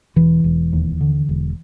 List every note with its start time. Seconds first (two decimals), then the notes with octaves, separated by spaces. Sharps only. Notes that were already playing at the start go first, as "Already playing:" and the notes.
0.16 E1 E3
0.44 E1
0.73 D#2
1.01 D3
1.29 E1